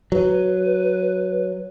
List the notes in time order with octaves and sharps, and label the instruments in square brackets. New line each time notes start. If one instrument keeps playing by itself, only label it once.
[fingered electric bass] F#3 [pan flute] B4